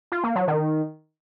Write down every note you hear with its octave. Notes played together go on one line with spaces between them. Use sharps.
F4
A#3
F#3
D#3